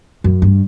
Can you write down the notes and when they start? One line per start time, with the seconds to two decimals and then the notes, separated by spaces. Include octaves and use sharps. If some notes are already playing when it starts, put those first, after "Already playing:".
0.24 F#2
0.42 G2